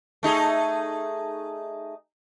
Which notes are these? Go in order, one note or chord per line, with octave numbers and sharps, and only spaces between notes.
A3 D#4 G#4